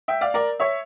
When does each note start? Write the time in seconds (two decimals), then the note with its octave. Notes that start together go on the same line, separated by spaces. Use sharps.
0.08 E5 G5
0.21 D5 F5
0.34 A#4 D5
0.60 C#5 E5